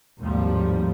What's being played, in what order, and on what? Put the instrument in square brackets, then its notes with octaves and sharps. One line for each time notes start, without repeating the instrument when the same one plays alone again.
[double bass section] G#1 D#2 A2 F3 G3